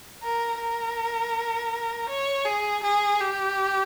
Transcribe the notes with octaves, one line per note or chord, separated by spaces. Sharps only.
A#4
A#4
C#5
G#4
G#4
G4